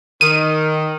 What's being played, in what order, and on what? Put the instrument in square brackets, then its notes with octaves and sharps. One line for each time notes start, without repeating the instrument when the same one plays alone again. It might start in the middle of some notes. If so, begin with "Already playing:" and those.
[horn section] D#3 [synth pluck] D#7